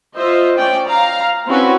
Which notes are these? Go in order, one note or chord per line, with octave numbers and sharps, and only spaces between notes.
F4 C5 D#5 E5
C#4 D5 G5
F5 A#5
C4 C#4 E4 F#4 B4